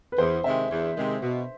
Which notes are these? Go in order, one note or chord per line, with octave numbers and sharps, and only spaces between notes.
B4
E2 C5
C3 D#3 G#3 E5
E2
C3 D#3 G#3
B2